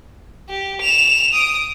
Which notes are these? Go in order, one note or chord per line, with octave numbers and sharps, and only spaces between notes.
G4
E7 F7
D#6 D7